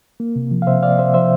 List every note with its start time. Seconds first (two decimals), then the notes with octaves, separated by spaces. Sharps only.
0.20 A#3
0.36 C3
0.51 F3
0.62 F5
0.67 C3 C5 E5
0.83 A#3 D5 F5
0.99 C3 C5 E5
1.14 F3 C5 E5